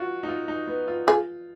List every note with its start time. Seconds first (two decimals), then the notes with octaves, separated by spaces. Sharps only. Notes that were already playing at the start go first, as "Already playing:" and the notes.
Already playing: F4 F#4
0.23 D#4
0.28 F4
0.48 D#4
0.67 B3
0.88 F4
1.07 F4 G#4